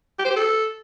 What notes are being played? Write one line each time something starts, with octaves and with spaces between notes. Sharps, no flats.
G4
C5
G4
A4